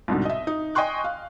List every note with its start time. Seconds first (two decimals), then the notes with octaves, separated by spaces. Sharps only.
0.08 C2 G#2 B2 D3
0.25 D#5 E5
0.47 D#4
0.75 D#5 G5 G#5 C6 C#6 F#6
1.04 F5